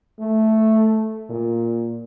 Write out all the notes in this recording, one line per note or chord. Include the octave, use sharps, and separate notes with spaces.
A3
A#2